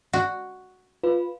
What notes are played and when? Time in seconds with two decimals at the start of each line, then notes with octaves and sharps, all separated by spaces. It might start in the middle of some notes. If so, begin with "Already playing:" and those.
0.13 F#4
1.03 F4 B4